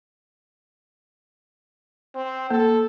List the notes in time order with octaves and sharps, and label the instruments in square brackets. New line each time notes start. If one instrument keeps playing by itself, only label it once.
[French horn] C4
[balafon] A#3 [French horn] A4